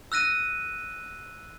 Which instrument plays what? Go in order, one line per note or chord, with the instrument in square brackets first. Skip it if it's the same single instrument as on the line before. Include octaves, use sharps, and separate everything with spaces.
[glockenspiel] E6 F#6 A#6 D#7